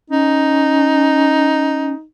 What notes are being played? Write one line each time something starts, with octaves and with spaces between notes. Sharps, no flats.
C#4 D#4